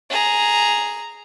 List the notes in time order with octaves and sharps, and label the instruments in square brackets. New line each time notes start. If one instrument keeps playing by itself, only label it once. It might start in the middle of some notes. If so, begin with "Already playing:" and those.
[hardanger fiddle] G#4 A#5